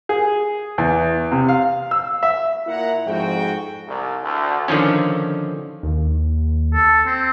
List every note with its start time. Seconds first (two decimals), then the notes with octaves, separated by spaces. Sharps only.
0.09 G#4
0.78 E2
1.32 C3
1.48 F5
1.91 E6
2.23 E5
2.67 A#2 E4 F#5 A#5
3.06 F2 G#2 F#4 G5
3.86 C2
4.23 D2
4.68 D3 D#3 F3 C#4
5.83 D#2
6.74 A4
7.06 C4